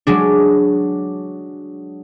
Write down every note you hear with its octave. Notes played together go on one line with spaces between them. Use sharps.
F#3 G#3 D4